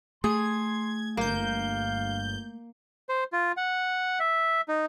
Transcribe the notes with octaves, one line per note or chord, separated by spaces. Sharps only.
A3 G#4 C6 G#6
G1 A#3 F5 G6
C5
F4
F#5
E5
D#4